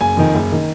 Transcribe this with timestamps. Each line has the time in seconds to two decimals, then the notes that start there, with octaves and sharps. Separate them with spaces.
0.01 F#1 G#5
0.17 F2 D#3
0.35 F#1
0.52 D#3